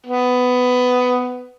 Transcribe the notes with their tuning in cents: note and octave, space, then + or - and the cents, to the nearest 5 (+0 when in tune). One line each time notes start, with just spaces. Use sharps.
B3 +15